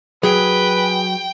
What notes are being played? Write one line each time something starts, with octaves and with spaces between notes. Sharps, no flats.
F#3 G#4 B4 G5